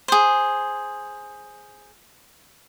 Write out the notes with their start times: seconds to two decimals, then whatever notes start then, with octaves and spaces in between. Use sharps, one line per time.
0.08 G#4 C5